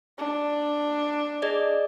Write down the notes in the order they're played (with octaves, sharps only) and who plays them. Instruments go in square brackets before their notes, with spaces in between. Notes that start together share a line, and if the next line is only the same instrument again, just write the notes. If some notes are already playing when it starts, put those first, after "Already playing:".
[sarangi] D4
[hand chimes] G#4 D5 D#5